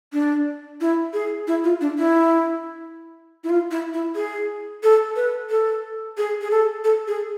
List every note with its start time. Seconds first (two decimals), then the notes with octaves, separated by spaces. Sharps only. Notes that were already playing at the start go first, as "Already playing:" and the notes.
0.13 D4
0.81 E4
1.14 G#4
1.47 E4
1.64 F4
1.81 D4
1.98 E4
3.44 E4
3.49 F4
3.71 E4
3.94 E4
4.16 G#4
4.83 A4
5.16 B4
5.50 A4
6.18 G#4
6.41 G#4
6.51 A4
6.85 A4
7.08 G#4